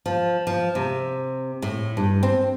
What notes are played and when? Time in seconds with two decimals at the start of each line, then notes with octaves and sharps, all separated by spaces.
0.06 F3
0.47 F3
0.75 C3
1.62 A2
1.97 G2
2.23 C4